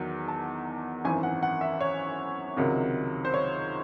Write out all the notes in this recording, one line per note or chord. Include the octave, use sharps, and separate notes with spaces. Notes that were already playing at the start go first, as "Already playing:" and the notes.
Already playing: E2 D#3 F#3
A5
G#1 F#2 E3 G#5
F#5
F#5
E5
C#5
C#2 C3 D#3 F#3
C5
C#5